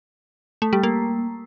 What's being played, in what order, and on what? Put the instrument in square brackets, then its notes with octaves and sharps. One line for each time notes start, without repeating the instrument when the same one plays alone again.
[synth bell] A3
G3
A#3